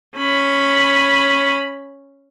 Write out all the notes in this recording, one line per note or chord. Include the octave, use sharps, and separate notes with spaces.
C#4 B5